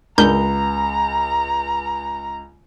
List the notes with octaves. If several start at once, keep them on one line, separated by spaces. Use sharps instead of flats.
C#2 D4 A#4 A#5 G6